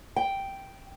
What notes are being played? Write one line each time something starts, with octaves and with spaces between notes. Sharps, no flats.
G5